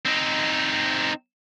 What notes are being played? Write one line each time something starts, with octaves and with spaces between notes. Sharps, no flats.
C4 D#4